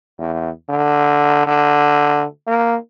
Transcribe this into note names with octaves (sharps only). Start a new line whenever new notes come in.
E2
D3
D3
A#3